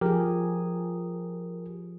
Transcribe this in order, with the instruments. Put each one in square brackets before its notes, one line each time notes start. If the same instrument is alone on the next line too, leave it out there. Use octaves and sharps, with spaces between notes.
[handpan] F3 G#4 [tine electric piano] G4 A#4